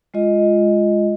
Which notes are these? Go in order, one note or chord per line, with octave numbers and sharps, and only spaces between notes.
G#3 F4 D#5